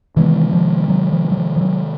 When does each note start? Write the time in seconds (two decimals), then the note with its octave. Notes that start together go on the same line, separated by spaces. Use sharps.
0.16 C3 D#3 E3 G#3 B3
0.53 F3
0.90 F#3
1.13 F3
1.31 F#3
1.37 F3
1.56 F3
1.61 F#3